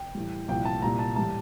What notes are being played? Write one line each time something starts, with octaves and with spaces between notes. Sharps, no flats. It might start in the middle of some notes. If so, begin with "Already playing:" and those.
Already playing: G5
A2 E3 G3
C2 A#2 F3 G5
A5
C2 A#2 G3 A#5
A5
A2 E3 G3 A5